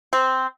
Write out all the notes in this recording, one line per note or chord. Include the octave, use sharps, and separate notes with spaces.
C4